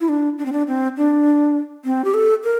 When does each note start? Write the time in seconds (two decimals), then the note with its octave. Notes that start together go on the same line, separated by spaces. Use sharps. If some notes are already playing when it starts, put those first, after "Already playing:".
0.01 E4
0.09 D4
0.38 D4
0.46 C4
0.52 D4
0.68 C4
0.97 D4
1.85 C4
2.05 G4
2.14 A4
2.44 A#4